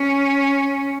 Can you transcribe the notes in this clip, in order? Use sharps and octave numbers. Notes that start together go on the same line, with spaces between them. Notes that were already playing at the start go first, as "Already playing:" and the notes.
Already playing: C#4